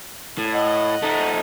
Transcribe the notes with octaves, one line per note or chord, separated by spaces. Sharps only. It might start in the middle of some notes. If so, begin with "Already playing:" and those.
A2
D#5 F#5
A3 D#4